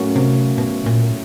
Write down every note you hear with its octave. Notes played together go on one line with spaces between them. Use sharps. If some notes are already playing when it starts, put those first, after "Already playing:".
Already playing: A2 F#3 A#3 C#4 F#4
C3
B2
A#2